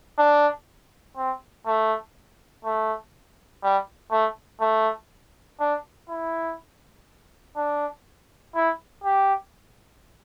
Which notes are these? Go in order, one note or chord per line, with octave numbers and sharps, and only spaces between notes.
D4
C4
A3
A3
G3
A3
A3
D4
E4
D4
E4
G4